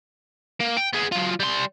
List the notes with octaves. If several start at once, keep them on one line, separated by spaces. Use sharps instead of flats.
A#3
G5
B3 G#4
F#3 F4
G3 C6